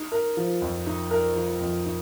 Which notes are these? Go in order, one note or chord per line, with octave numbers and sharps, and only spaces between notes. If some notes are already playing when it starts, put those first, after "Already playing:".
Already playing: D#4
A#4
F3
F2
D#4
A#4
F3
F2
D#4